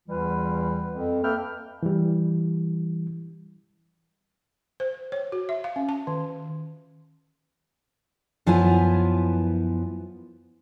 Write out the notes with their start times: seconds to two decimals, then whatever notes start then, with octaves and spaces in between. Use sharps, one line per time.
0.09 E2 E3 G3 F4 B4
0.91 F2
1.23 A#3 A4 B4 E5 G5 F6
1.83 E3 G3
4.80 C5
5.12 C#5
5.32 F#4
5.49 E5
5.64 F5
5.76 C#4
5.89 A5
6.07 D#3
8.46 F#2 F3 B3 E4 B4 G#5